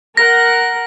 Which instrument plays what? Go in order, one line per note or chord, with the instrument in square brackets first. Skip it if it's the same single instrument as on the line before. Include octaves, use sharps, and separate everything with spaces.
[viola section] A#4 F#5 [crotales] A#6